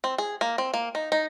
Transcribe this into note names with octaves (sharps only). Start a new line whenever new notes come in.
C4
G#4
A#3
C4
A#3
D#4
D#4